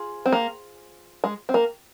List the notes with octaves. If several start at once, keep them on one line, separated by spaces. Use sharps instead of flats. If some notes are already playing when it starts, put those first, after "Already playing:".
Already playing: F4 G#4 C5
C4
A#3
G#3
C4
A#3